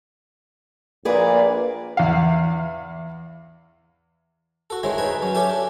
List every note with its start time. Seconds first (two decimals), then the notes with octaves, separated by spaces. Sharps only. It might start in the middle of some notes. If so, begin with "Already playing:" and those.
1.05 A#1 A#2 G#4 B4 D5
1.97 E2 F5
4.70 F#4 A4
4.83 D#3 G#3 C4 E4 C#5
4.98 D#4 B4 G#5 A5
5.22 F#3 C#4
5.34 C#4 G4 A4 E5 G#5 A5
5.50 D4